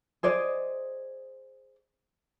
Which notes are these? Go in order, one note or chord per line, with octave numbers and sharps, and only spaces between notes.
G#4 C5 D5 D#5